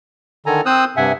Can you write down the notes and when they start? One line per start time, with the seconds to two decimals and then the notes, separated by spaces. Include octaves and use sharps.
0.46 D3 D#3 A4 G#5 A#5
0.66 C4 C5 D#6 E6 F#6
0.97 G2 C3 E5 F#5 G#5